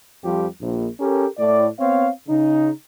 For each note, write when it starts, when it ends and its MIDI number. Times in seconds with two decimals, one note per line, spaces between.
0.23 0.46 41
0.23 0.46 53
0.23 0.46 55
0.23 0.46 67
0.60 0.87 34
0.99 1.25 61
0.99 1.25 67
0.99 1.25 69
0.99 1.25 70
1.37 1.67 45
1.37 1.67 74
1.78 2.09 59
1.78 2.09 60
1.78 2.09 73
1.78 2.09 77
2.28 2.68 49
2.28 2.68 63